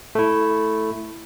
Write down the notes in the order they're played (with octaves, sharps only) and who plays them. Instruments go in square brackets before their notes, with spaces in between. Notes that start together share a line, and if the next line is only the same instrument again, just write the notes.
[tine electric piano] A3 E4